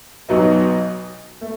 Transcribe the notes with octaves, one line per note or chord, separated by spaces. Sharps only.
B1 B2 F#3 B3 D#4
A3